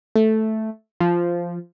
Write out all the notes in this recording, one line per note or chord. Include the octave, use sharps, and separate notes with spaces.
A3
F3